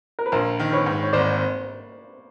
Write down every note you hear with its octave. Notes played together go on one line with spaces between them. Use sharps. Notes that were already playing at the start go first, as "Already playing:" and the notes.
A#4
B4
A#1 A#4 C5
D#3
B4 C#5
G#2
C#5
G#1 C5 D5